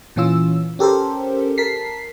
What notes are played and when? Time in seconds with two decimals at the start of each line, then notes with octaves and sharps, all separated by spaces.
0.16 A#2 E3 C#4 F4 E6
0.79 C#4 G4 A4 A#4 C5
1.58 A#4 A5 B6 C7